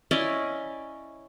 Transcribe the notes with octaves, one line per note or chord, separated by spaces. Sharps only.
C#4 E4 D5 D#5